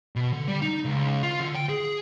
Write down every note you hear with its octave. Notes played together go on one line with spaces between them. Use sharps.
B2
D3
G3
D#4
C#2
F4
D3
G5
G#4